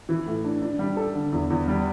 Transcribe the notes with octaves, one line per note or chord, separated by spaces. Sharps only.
E3
A2
D4
D4
G3
A4
D3
E2
E2
G3